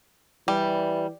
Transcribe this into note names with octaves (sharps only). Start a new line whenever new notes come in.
E3 G3